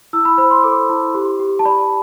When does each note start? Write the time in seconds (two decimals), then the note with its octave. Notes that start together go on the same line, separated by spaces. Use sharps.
0.13 E4 E6
0.25 B5
0.38 C5 B5
0.51 C6
0.63 A4 D6
0.89 E4
1.14 G4
1.39 G4
1.59 A5
1.65 D5 B5